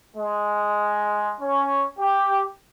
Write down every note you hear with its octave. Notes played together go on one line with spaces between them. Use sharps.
G#3
C#4
G4